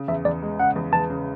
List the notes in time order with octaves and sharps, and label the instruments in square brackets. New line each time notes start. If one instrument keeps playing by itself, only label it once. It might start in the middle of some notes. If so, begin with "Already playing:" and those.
Already playing: [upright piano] C#3
[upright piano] E2 [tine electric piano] E5
[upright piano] E2 [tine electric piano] D5
[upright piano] G#3
[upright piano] C#3 [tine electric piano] F#5
[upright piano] E2
[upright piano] E2 [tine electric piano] A5
[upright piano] C#3